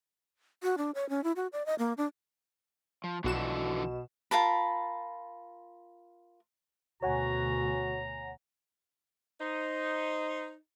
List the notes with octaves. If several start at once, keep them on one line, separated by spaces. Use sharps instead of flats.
F#4
D4
C#5
C#4
E4
F#4
D5
D#5
A#3
D4
F3
B1 B2 D3 E3 F3 F#4 E7
F4 A#4 A5 B5
D2 B2 F#4 C#5 F#5 G#5 A#5
D#4 C5